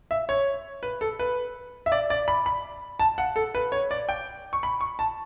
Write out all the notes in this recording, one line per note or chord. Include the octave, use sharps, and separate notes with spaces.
E5
C#5
B4
A4
B4
E5
D5
D5
B5
B5
A5
F#5
A4
B4
C#5
D5
G5
C#6
B5
C#6
A5